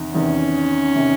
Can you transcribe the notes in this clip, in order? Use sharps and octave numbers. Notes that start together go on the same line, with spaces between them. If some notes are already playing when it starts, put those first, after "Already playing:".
Already playing: E2 C3 D#3
E2 C3 D#3 C#4
C3 D#3